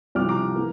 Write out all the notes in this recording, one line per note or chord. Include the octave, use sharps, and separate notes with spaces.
C2 C3 F3 D6 F6
A#5 D6
E3 A#3